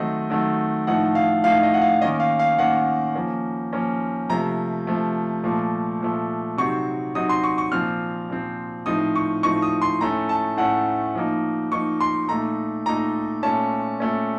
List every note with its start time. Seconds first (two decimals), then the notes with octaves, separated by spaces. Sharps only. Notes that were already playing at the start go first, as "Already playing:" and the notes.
Already playing: D#3 F#3 A3 C4 D#5
0.30 D#3 F#3 A3 C4
0.87 A2 F3 A3 D#4 F#5
1.15 F5
1.44 A2 F3 A3 D#4 F5
1.63 D#5
1.74 F#5
1.82 F5
2.01 D#3 A#3 C#4 D#5
2.20 F5
2.39 F5
2.58 D#3 A#3 C#4 F#5
3.15 F3 A#3 C#4
3.73 F3 A#3 C#4
4.30 C3 F3 A3 A#5
4.87 C3 F3 A3
5.44 A#2 F3 A3
6.01 A#2 F3 A3
6.57 C3 F#3 C4 D#4 C#6
7.15 C3 F#3 C4 D#4 D#6
7.29 C6
7.44 C#6
7.58 C#6
7.72 A#2 F3 C4 F6
8.29 A#2 F3 C4
8.86 A2 F3 C4 D#4 D#6
9.16 C#6
9.43 A2 F3 C4 D#4 C#6
9.62 D#6
9.82 C6
10.01 A2 A3 C#4 A#5
10.29 A5
10.57 A2 A3 C#4 F#5
11.15 F3 A#3 D#4
11.72 F3 A#3 D#4 C#6
12.01 C6
12.28 A#2 A3 D#4 A#5
12.86 A#2 A3 D#4 A#5
13.43 A#2 A3 C#4 A5
14.00 A#2 A3 C#4